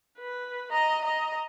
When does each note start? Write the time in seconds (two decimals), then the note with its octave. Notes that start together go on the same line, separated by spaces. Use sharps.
0.19 B4
0.71 D#5 A#5
1.02 D#5 A#5